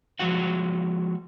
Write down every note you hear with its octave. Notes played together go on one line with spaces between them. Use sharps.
F3 G#3 F#4 F#5